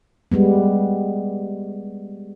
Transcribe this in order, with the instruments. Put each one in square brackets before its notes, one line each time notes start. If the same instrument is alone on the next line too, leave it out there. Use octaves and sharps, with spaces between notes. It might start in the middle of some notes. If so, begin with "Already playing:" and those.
[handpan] G3 G#3 B3